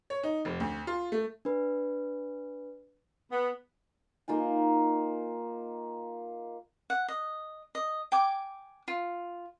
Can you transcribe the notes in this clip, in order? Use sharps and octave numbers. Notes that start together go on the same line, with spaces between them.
C#5
D#4
F1
D2
F4
A3
D4 B4
B3
A#3 D#4 F4 G#5
F#5
D#5
D#5
G5 G#5 D6
F4